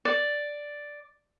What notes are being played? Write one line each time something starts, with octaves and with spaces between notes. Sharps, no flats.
D5